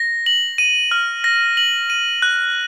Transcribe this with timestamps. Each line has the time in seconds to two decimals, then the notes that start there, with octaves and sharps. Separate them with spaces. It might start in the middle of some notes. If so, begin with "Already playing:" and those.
Already playing: A#6
0.26 F#7
0.58 D#7
0.91 F6
1.24 A#6
1.57 F#7
1.90 D#7
2.22 F#6